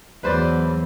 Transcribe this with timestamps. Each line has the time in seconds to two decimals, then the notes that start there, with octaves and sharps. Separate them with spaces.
0.23 E2 F#3 B4 C5 D5